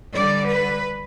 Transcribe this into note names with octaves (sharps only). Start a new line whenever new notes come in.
D3 G3 D5
B4